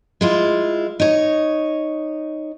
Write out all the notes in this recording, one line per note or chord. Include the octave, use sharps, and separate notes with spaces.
G#3 E4 F4
D#4 C#5